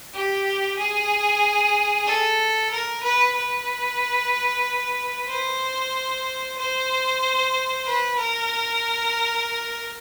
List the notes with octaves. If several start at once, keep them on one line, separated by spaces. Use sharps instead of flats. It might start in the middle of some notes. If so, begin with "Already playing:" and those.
G4
G#4
A4
A#4
B4
B4
C5
C5
B4
A#4